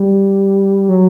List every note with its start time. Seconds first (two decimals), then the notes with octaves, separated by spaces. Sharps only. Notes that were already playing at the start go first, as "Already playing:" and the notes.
Already playing: G3
0.89 F#3